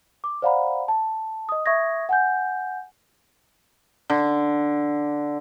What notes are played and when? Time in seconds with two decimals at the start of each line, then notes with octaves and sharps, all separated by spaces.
0.24 D6
0.42 C5 D5 F5 F#5 A#5 B5
0.88 A5
1.49 D#5 D#6
1.66 E5 C#6 D#6 G#6 A#6
2.09 F#5 G#5 G6
4.10 D3